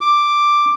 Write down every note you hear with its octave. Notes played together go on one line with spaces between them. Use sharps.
D6